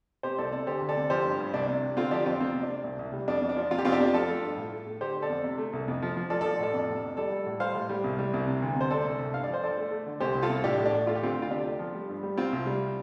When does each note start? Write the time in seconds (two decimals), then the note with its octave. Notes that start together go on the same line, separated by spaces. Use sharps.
0.23 C3 G4 C5
0.38 C2 A4 D5
0.52 C3 A4 D5
0.67 D2 G4 C5
0.82 D2
0.89 A4 D5
0.97 C3
1.10 F3 G4 C5
1.25 G2
1.40 G2
1.53 C2 D4
1.68 C3
1.83 C3
1.97 D3 C4 F4
2.11 F3 D4 G4
2.26 F2 C4 F4
2.40 C3 C4
2.54 C3
2.63 D4
2.70 C3
2.84 C2
2.99 C2
3.12 G3
3.28 F2 D4
3.42 F2
3.49 D4
3.56 F3
3.71 C3 F4
3.78 G4
3.85 F2 C4 F4
3.92 D4 G4
4.00 F2
4.13 F3 F4 A4
4.29 A3
4.43 G2
4.57 A2
4.72 A3
4.87 A3
5.01 D3 G4 C5
5.15 D3
5.22 A4 D5
5.29 F2
5.44 C3
5.58 A3
5.73 C2
5.88 F2
6.02 F3
6.17 F3
6.30 F3 A4 D5
6.41 F3 A4 D5
6.59 A2 A4 D5
6.74 F2
6.89 C3
7.03 F2
7.17 G3 A4 D5
7.32 G3
7.46 A2
7.60 G3 C5 F5
7.75 A2
7.89 G3
8.04 C2
8.19 G3
8.34 C2
8.48 C3
8.62 D2
8.76 C3 C5
8.90 A3 A4 D5
9.05 C2
9.19 C2
9.34 G2 F5
9.44 D5
9.49 F3 C5
9.63 G2 A4 D5
9.77 A3
9.91 A3
10.06 D3
10.20 C2 G4 C5
10.35 C2
10.42 F4 A4
10.50 C2
10.64 A2 D4 G4
10.78 A2
10.86 D4
10.93 A2
11.07 A3 F4
11.15 G4
11.22 D2 C4 F4
11.36 D2
11.42 F4
11.50 C3 D4 G4
11.65 A3
11.79 F3
11.94 G3
12.09 G2
12.23 G3
12.37 C3 C4 F4
12.53 C2
12.66 G3